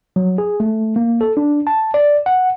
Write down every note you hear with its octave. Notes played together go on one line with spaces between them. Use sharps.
F#3
G#4
A3
A#3
A4
D4
A5
D5
F#5